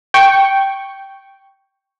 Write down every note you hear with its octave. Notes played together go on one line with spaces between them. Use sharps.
G5 C#6